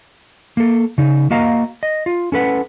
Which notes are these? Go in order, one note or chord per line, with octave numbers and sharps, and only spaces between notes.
A#3 A4
C#3 D#4
A#3 F#4 D#5 F5 A#5
D#5
F4
C#4 A4 B4 F#5